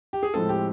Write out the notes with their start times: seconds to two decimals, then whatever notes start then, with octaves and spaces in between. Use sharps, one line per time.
0.13 G4
0.23 G#4
0.33 A2 F3 G#3 C4 A4
0.49 G4